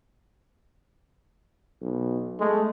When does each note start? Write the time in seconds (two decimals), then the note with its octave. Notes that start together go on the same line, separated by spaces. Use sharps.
1.81 B1
2.40 G#3 A3